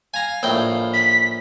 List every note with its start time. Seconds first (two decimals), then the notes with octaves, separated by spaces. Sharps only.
0.14 F5 G#5 A#5
0.43 A#1 A2 G5
0.94 B6